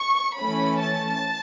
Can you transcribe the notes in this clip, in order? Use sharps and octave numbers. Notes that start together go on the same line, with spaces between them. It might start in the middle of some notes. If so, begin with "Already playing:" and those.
Already playing: C#6
E3 A3 C#4 B5
A5